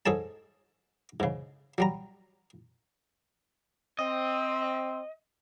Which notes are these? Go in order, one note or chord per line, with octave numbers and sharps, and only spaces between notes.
G#2 G#4 A4 C#5 A5
G#2 C#3
F#3 G3 A#5
C4 D#5